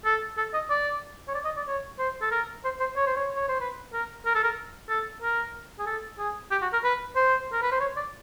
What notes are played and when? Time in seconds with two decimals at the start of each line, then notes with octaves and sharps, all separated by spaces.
0.05 A4
0.37 A4
0.53 D#5
0.70 D5
1.28 C#5
1.34 D5
1.45 D#5
1.57 D5
1.67 C#5
1.99 C5
2.21 A4
2.31 A#4
2.64 C5
2.80 C5
2.96 C#5
3.06 C5
3.16 C#5
3.36 C#5
3.48 C5
3.60 B4
3.93 A#4
4.26 A#4
4.35 A4
4.44 A#4
4.89 A4
5.22 A#4
5.79 G#4
5.86 A4
6.18 G#4
6.51 G4
6.62 F#4
6.73 A#4
6.84 B4
7.16 C5
7.53 A#4
7.62 B4
7.72 C5
7.80 C#5
7.96 D5